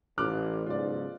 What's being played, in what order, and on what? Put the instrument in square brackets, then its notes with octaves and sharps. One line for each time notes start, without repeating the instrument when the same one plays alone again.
[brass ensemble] A1 [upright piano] D6 F6 F#6
[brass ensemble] B1 G#2 C#3 [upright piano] F4 D5